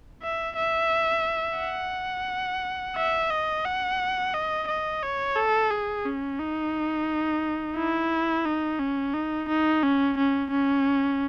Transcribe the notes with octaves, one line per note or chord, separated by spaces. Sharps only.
E5
E5
F#5
E5
D#5
F#5
D#5
D#5
C#5
A4
G#4
C#4
D#4
E4
D#4
C#4
D#4
D#4
C#4
C#4
C#4